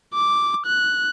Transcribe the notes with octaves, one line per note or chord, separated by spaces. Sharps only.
D6
F#6